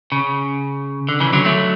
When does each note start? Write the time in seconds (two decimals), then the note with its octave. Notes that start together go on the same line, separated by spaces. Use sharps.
0.12 C#3
1.09 D3
1.20 C#3 E3
1.33 D3 F#3
1.45 F#3 A3